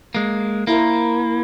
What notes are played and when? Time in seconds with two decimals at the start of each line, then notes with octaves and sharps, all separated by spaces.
0.15 G#3 A#3
0.67 A#3 E4 A#4 C5